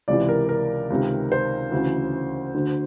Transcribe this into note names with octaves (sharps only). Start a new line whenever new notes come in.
C#2 C3 E3 D5
A#4
A#4
C#2 C3 D#3
C5
D2 C#3 E3
D2 D3